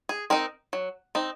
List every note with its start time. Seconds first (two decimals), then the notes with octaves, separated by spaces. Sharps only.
0.09 G#4
0.30 C4 D#4 A#4
0.73 F#3
1.15 C4 D#4